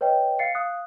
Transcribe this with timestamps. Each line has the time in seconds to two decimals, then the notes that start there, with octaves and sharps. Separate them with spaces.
0.01 B4 C#5 D#5 G5
0.39 F5 A6 C7 C#7
0.55 F5 D#6 F#6